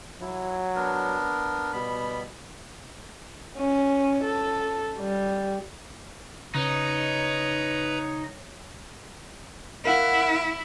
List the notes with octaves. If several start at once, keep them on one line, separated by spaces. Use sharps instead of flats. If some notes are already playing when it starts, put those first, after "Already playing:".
F#3 E4
B3 D4 A#4
B2 G3 B3 B5
C#4
A4
G3
C#3 D#4 B4 C#5 A#5
E4 A#4 F5 F#5